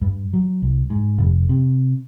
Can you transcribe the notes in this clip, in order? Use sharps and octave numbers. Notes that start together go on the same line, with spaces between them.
G2
F#3
C2
G#2
F1
C3